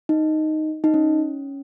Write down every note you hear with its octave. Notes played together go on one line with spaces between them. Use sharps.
D#4
D#4
C#4